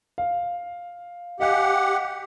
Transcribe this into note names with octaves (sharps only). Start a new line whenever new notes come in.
F5
G4 D#5 F5 F#5 G#5